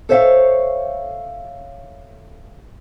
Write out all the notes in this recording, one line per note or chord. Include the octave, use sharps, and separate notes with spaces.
A4 C5 C#5 E5 F5